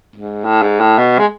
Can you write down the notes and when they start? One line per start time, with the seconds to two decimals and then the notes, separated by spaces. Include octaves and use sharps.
0.15 G#2
0.44 A2
0.62 G#2
0.80 A2
0.98 B2
1.19 G#3